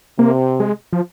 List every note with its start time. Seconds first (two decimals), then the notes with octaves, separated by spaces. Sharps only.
0.19 C3 A#3
0.60 G#3
0.93 F3